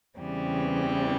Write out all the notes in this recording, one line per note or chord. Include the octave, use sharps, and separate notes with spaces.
E2 C#3 E3 G3 C4